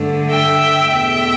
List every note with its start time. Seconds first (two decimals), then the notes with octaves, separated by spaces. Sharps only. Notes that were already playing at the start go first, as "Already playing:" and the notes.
Already playing: G2 D3 A3
0.30 E5 G5
0.89 E2 B2 A3 E5 G5